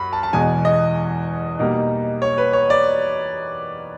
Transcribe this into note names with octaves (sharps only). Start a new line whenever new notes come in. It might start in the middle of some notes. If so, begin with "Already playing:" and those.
Already playing: F#2 B5
A5
A5
E2 B2 G#3 G#5
D#5
B2 G3 A#3 D#4
C#5
B4
C#5
D5